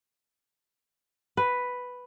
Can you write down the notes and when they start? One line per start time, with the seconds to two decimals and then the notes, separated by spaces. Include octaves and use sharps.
1.37 B4